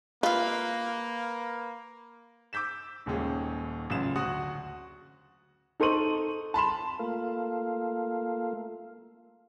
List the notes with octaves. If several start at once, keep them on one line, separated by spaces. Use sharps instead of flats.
A#3 F4 B4 F5
D6 E6 G6 B6 E7
D#1 D#2 G#3 C#4 G#4
A1 F#2 C#3 F4 E7
D2 F#4 F#5 C#6 D#6
D#4 A4 C5 C#6 D#7 F#7
A5 B5 C6 E7
A3 A#3 F4